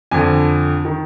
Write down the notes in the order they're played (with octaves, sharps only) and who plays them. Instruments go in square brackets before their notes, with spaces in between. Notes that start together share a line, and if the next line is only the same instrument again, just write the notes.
[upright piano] F2 D3 G#5
D#3